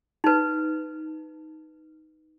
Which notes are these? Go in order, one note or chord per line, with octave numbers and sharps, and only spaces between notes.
D#4 B4